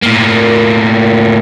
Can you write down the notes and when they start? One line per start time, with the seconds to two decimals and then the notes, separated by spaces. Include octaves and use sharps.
0.03 A2 A#3